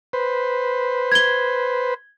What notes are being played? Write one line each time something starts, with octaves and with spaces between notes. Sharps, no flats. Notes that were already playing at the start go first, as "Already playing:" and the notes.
B4 C5
G#6 G7